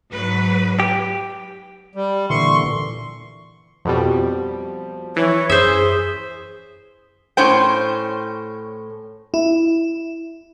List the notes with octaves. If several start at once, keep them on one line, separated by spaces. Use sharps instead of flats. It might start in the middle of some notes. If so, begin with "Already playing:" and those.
G#2 F#3 B4
G4
G3
A#2 D3 E3 C6 C#6
F2 B2 F3 G3
E3 C#5
F#2 G#4 C5 E5
A2 C#4 C5 G5
E4